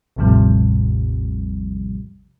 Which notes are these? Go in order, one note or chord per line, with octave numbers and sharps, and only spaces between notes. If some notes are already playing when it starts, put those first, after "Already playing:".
A1 E2 A2 C3 F3 G3